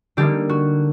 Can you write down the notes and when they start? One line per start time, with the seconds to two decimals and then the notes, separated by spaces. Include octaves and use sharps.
0.17 D3 G3 A#3 D#4 G4
0.49 F#4